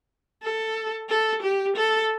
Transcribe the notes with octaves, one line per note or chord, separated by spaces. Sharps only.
A4
A4
G4
A4